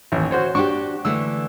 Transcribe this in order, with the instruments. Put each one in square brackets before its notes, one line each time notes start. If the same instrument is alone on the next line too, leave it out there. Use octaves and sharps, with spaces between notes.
[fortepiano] A1 D#2
F#4 C5 C#5
[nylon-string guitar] D4 F#4 G4 [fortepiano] C#6
[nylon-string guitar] D3 E3 A3 [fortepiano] E6